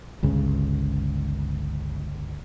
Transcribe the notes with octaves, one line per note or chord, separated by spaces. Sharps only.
G1 C#2 C#3